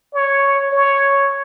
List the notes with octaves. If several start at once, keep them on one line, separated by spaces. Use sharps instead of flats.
C#5
C#5